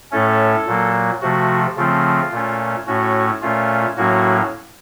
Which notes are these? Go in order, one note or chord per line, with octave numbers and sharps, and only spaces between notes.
A2 A3 C#4 A4
A#2 F#3 A#3
C3 F3 A3 F#4
C#3 F3 A3 C4 F4
A#2 A3 C#4
A2 A3 C#4 F#4
A#2 A3 C#4 F4
A2 F#3 A#3 C#4 F#4